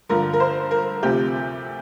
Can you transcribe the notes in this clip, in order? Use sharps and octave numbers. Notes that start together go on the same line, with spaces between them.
G2 D3 F3 A#4
A#4
C5
A#4
D2 C3 F3 G4